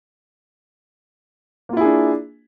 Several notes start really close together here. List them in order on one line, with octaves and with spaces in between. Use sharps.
A#3 F4 E4 G#4 D4